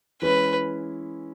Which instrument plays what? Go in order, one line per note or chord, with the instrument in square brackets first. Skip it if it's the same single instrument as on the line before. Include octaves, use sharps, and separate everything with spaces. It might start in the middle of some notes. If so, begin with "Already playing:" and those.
[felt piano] E3 G#3 C#4 E4 [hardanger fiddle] B4